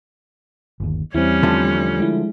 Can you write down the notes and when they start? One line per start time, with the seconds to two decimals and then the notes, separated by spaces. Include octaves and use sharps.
0.80 G1 D#2
1.14 E2 G3 C4 C#4 E4
1.43 D3 F3 A3
1.99 G#3 E4